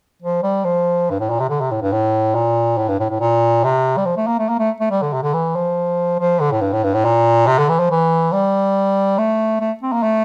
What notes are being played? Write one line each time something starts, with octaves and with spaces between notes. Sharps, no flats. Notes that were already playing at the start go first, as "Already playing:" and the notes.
F3
G3
F3
G2
A2
A#2
C3
D3
C3
A2
G2
A2
A#2
A2
G2
A2
A2
A#2
C3
G3
F3
A3
A#3
A3
A#3
A3
A3
G3
D3
C3
D3
E3
F3
F3
D3
A2
G2
A2
G2
A2
A#2
C3
D3
E3
F3
E3
G3
A3
A3
C4
A#3
A3